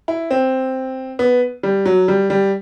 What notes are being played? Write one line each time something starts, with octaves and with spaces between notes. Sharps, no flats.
E4
C4
B3
G3
F#3
G3
G3